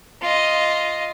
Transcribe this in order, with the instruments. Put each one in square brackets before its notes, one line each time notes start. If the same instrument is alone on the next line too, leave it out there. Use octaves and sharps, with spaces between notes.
[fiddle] F4 D#5